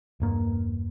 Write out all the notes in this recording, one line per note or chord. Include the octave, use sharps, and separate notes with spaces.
E1 G2 A#3